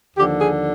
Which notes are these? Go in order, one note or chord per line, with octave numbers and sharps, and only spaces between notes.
D#2 D3 F3 G4
G#4